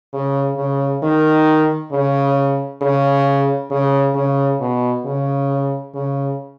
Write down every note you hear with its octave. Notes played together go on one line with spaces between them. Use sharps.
C#3
C#3
D#3
C#3
C#3
C#3
C#3
B2
C#3
C#3